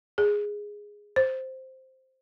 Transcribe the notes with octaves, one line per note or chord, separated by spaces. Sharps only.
G#4
C5